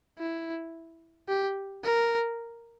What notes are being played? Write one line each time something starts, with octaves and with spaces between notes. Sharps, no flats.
E4
G4
A#4